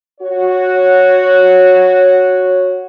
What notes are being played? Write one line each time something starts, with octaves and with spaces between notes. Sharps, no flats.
F#4 C#5